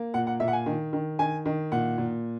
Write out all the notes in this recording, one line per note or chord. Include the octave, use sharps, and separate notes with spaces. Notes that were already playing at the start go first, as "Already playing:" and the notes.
Already playing: A#3
A#2 F#5
F#5
A#2 E5
F#5
G#5
D#3
D#3
D#3 G#5
D#3
A#2 F#5
A#2